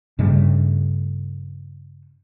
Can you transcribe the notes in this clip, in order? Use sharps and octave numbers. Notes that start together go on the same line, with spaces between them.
G2 C#3 G3 A3